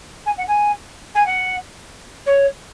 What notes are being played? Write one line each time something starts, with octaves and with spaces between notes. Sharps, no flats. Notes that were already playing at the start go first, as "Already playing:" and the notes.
G#5
F#5
G#5
G#5
F#5
C#5